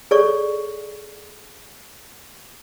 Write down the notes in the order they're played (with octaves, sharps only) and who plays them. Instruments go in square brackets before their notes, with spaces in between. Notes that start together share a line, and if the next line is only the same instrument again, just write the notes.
[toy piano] G#4 A4 C#5 D5 C#6